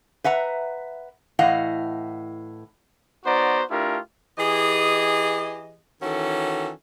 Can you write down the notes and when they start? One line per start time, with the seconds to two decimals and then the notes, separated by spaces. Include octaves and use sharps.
0.24 B4 E5 F#5 A#5
1.39 A2 E3 D#5 F5 F#5
3.25 B3 D#4 F#4 C5 D5 A#5
3.70 A3 D4 E4 F4 G4 A#4
4.37 E3 G4 G#4 D#5
6.02 D#3 E3 C#4 F#4 A4